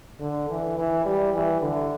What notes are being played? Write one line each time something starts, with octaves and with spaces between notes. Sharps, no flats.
D3
E3
E3
G3
E3
D3